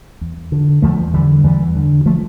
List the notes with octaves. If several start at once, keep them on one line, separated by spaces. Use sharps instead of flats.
E2
D3
E2 F3 A3
D3 E3 G3
E2 E3 G3
D3
F3 A3